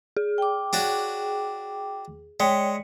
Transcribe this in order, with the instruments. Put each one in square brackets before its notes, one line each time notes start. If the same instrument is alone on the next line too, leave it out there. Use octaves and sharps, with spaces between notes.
[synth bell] G#4
[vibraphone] G5 D6
[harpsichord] D4 F#4 C#5
[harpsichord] G#3 [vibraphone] C#5 G5 [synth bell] D5 C#7